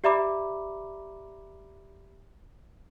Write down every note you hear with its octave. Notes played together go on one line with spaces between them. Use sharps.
G4 D5 E5 A#5 B5 D6